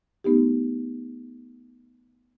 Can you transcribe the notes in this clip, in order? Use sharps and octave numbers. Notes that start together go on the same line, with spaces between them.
A3 B3 D#4 G4